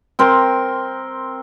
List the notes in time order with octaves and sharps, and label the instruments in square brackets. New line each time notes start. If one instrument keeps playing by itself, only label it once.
[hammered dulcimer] C4 A#4 C6